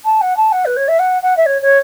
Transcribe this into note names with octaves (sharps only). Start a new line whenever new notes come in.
A5
F#5
A5
F#5
B4
C#5
E5
F#5
F#5
E5
C#5
C#5